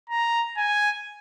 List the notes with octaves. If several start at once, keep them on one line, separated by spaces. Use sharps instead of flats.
A#5
G#5